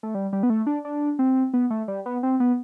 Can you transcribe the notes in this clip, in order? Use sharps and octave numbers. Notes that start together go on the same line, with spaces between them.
A3
G3
G3
B3
A3
D4
D4
C4
B3
A3
G3
B3
C4
B3